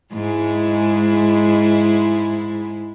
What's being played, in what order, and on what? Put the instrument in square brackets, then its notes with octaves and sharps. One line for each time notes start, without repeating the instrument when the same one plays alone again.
[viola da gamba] G#2 G#3 E4